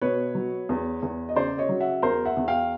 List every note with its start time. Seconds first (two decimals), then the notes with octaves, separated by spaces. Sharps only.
0.01 B2 B4 C#5
0.35 F#3
0.69 E2
1.02 E2
1.29 D#5
1.36 C#3 C5 D5
1.58 C#5 D#5
1.69 F#3
1.80 E5 F#5
2.02 E2 A#4 C5
2.25 E5 F#5
2.37 E2
2.48 F5 G5